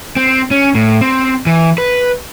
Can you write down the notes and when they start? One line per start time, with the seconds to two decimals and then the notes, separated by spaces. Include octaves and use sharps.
0.16 C4
0.51 C#4
0.75 A2
1.01 C4
1.46 E3
1.78 B4